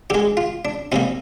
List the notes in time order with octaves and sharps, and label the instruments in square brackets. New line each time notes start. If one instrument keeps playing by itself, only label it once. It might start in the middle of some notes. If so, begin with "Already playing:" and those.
[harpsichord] D3 G#3 G4
F4
D4
C3 G3 A#3 D#4